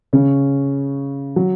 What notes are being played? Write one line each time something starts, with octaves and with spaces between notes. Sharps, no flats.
C#3 C#4
F#3